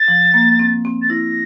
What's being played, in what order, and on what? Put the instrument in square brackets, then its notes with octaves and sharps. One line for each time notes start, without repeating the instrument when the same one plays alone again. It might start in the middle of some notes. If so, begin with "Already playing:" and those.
Already playing: [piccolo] A6
[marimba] F3
A#3
C4
C4
[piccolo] A6
[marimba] E4 [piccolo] A#6